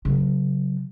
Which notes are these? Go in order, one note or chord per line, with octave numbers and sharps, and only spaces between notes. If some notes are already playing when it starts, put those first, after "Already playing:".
C#3 F#3